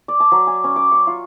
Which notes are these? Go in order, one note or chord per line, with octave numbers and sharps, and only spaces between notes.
D5
A5
F#3
G#5
C#4
D6
C#6
F4